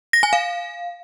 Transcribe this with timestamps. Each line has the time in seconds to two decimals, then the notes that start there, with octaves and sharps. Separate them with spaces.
0.13 A#6
0.23 G#5
0.33 F5